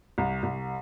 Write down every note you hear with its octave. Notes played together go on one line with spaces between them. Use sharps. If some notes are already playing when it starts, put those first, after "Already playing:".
C2
C2